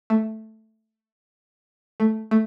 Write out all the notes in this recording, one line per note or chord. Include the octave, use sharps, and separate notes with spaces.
A3
A3
A3